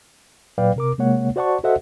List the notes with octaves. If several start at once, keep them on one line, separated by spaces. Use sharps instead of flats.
A#2 F#3 B4 D5 F5 G5
C3 A#4 D6
C3 G#3 A#3 C#5 F#5
F#4 C5 D5 F#5 A5 C#6
F#4 A4 C5 D#5 E5 F#5